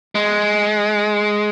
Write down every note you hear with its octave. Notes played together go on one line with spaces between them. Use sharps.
G#3